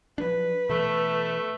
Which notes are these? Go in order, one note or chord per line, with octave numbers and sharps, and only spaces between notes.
F3 F#3 D4 B4
B2 E3 A3